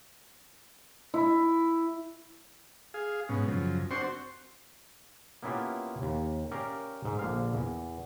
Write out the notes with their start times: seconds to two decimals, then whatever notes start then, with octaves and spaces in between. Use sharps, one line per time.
1.14 E4
2.94 G#4 F5
3.29 G#2 B2 C#4
3.48 F#2 C#3 F3
3.91 C4 D4 F#4 C5 C6 C#6
5.43 A#3 B3 C#4 E4 F4 G4
6.02 D#2
6.51 C#4 G4 A#4 D5 F5
7.05 G#2
7.19 A#1 D3 F5
7.54 E2